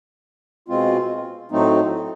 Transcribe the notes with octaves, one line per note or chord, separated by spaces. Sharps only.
B2 G#3 C4 F4
A2 F#3 A3 C4 D#4